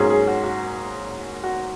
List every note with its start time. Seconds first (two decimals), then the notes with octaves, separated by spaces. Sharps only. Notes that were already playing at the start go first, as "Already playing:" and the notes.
Already playing: G#2 F#3 A#3 C#4 G#4
0.10 G#4
0.27 F#4
0.44 F#4
1.44 F#4